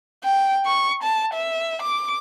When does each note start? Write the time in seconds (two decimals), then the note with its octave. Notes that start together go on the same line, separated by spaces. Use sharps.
0.24 G5
0.66 C#6
1.03 A5
1.34 E5
1.82 D6